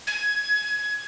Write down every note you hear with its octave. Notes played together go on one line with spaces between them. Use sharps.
G#6